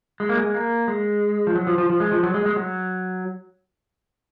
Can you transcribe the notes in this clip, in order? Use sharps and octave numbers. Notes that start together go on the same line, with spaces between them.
G#3
A#3
G#3
A#3
G#3
F3
F#3
F3
F3
F3
G#3
F3
F#3
G#3
G#3
F#3